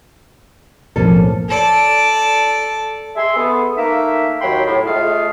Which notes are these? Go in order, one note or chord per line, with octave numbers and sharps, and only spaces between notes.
B1 F2 A2 F3 A#3 C#4 A4
A4 D5
G#4 E5 C6
B3 G#4 A4
A3 A#3 D#4 E5
D#2 F#3 G5 B5 C6
A2
G#3 A3 F4 G#4 F5